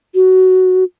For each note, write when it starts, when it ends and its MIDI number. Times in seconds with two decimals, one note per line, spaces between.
0.15 0.84 66